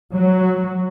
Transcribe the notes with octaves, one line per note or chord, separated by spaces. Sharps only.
F#3